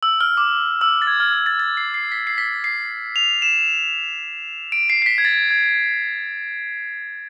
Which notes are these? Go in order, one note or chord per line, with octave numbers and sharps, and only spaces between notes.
E6
F6
D6
E6
A6
G#6
F6
F6
A6
A6
C7
C7
B6
C7
B6
C7
F7
E7
D7
C7
C7
B6
G#6
A6
G#6